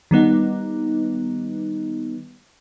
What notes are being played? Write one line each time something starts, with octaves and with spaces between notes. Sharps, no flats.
D#3 G3 B3 D#4